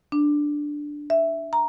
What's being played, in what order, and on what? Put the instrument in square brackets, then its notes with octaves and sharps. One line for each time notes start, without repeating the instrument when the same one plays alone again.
[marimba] D4
E5
A#5